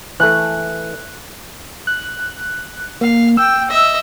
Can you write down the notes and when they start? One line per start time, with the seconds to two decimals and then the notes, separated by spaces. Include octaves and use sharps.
0.20 E3 A3 F#6
1.87 F#6
3.01 A#3 F5
3.37 G5 E6
3.69 D#5 E5